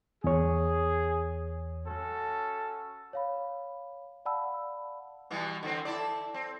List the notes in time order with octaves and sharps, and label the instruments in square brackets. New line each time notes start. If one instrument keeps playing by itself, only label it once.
[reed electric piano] E2 C#5 [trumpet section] G#4
[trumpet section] C#4 F#4 A4
[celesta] C#5 F5 B5
D5 F5 F#5 A5 B5 E6
[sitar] B2 E3 G3
D3 E3 C4
E4 A4 D5
C4